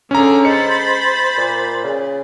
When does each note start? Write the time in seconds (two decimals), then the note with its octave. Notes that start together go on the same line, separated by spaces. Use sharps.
0.11 D3 C#4 G#4 A4 A#5
0.45 G#3 C5 B5 A6 C#7
1.37 A#2
1.84 C#3